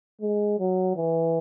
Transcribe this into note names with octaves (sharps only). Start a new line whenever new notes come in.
G#3
F#3
E3